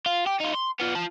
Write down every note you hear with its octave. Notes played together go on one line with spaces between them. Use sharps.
F4
G4
D#4 F4
C6
B3 F4
F4 A5